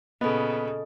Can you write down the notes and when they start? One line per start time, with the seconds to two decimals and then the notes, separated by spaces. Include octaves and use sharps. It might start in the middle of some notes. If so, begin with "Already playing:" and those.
0.21 A#2 C#3 B3 A4 D#5